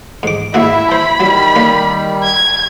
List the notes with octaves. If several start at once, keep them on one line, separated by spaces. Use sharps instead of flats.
G#2 D6
G#2 A#3 E4 F#4 E5
C5 B5
D#3 F#3 G3 E4
A#3 C#4
G#6